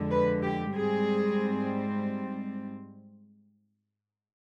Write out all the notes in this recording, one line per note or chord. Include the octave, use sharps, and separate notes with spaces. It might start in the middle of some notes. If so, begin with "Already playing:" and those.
Already playing: F2 D3 G#3
B4
G4
G#2 G3 C4 G#4